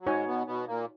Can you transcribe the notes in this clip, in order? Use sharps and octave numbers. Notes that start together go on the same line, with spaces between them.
F#3
G#2 G#3 D#4 F#4 C#5 G#5
B2 B3
B2 B3
A#2 A#3